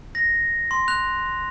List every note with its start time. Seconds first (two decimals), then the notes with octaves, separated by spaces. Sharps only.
0.15 A#6
0.71 C6
0.88 F#6 F7